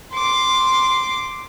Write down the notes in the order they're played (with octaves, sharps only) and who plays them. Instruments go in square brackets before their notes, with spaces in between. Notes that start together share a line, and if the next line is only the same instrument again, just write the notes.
[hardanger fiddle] C6 D6